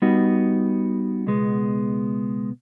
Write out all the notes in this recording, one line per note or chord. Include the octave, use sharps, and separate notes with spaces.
G3 B3 D#4 F#4
C#2 B2 G#3 B3